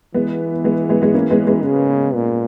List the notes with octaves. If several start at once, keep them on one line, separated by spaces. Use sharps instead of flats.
E3 G#3 B3
G#3 B3
G#3 B3
G#3 B3
A#3 C#4
G#3 B3
G#3 B3
C#3
A#2